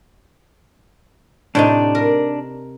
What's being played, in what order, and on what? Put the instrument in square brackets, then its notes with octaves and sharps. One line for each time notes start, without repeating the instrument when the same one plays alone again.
[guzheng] A2 C3 D#4 [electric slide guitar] D4
[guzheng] A#4